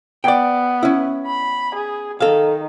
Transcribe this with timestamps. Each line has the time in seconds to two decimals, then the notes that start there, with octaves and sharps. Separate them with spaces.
0.24 B3 D5 G5
0.83 C#4 E4
1.26 B5
1.75 G#4
2.20 D#3 A4 F5